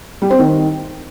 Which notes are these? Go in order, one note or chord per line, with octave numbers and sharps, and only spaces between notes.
G3
C4
D#3